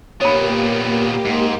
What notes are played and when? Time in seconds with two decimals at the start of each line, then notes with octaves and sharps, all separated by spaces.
0.21 A#2 A#3 B3 G4 C#5 B5
1.25 G#2